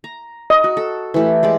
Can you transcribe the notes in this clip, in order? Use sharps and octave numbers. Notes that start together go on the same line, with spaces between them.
A#5
D#5
F#4
A4
E3 A3 G4
G#3 G4 D5